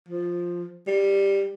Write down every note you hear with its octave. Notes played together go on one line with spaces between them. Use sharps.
F3
G3